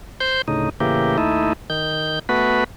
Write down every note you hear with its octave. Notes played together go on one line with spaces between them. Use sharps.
C5 G6
D2 A2 C#3 D#4
A2 C#3 E3 A#3 G4
D#2 A3 D#4 E4
D#3 G6
A3 B3 F#4 B4